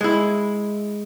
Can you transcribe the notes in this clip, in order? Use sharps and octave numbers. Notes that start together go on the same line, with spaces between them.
G#3 E4